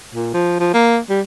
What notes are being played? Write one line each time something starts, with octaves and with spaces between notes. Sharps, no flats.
A#2
F3
F3
A#3
G3